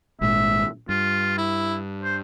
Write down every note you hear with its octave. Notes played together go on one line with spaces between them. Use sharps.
G#1 A#2 G#3 E5
G2 F4
E4
C5